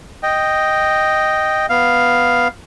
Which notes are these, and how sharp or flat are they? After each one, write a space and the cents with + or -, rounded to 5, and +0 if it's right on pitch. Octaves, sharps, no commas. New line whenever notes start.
D#5 +0 G5 -5
B3 +0 F5 +0